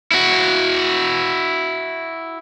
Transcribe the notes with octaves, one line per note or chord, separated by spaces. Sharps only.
E4 F#4